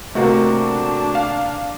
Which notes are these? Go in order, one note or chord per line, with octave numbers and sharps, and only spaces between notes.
C3 A3 A#3 D4 F#4
F5